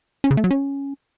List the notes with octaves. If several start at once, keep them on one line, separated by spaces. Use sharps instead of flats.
C#4
C#3
A3
F#3
C#4